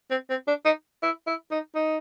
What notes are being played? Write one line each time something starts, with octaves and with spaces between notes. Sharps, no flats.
C4
C4
D4
D#4
E4
E4
D#4
D#4